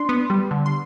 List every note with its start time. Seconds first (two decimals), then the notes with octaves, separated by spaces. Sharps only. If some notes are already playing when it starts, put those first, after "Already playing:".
Already playing: D4 C6
0.09 B3
0.30 G3
0.51 D3
0.66 C6